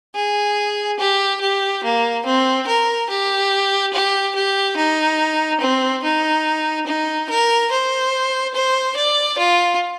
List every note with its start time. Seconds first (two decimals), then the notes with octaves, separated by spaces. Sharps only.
0.15 G#4
0.99 G4
1.41 G4
1.84 A#3
2.26 C4
2.67 A#4
3.10 G4
3.93 G4
4.35 G4
4.77 D#4
5.61 C4
6.03 D#4
6.87 D#4
7.29 A#4
7.71 C5
8.54 C5
8.96 D5
9.38 F4